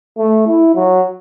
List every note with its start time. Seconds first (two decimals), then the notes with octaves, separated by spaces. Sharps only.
0.18 A3
0.47 E4
0.75 F#3